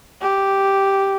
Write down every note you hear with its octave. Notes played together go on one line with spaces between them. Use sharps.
G4